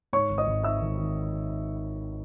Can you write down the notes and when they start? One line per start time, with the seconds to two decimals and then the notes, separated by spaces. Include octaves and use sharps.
0.13 G#2 C#5 C#6
0.30 G#1
0.38 D#5 D#6
0.47 G#1
0.64 D#3 E5 E6
0.81 G#1
0.98 D#3